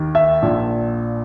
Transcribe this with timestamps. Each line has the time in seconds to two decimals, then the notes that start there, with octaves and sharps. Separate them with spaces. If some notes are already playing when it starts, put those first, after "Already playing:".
Already playing: D#2 D#3
0.15 E5
0.42 A#1 A#2 F3